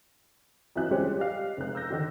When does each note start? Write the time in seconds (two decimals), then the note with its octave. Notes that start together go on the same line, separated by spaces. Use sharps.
0.76 F2 E3 F#3 E5 F#6
0.91 F3 G3 G#3 C4 C#4 G4
1.17 G4 D5 D#5 F5
1.57 F1 G#3 F#6
1.75 E6 G6 A#6
1.90 D3 D#3